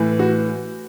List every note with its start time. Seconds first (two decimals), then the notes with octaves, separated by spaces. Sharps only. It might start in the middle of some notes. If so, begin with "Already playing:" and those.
Already playing: A2 E3
0.19 F#4